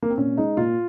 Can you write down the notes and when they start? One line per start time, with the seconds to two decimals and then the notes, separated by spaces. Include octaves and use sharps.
0.03 A#3
0.10 C4
0.18 A#2 C#4
0.37 G#3 D#4
0.57 A#2 F4